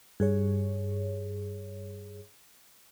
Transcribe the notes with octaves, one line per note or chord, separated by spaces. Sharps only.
G2 G#4 C#5